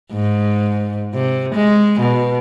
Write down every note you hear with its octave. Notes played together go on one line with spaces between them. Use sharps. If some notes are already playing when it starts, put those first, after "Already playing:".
G#2
C3
G#3
B2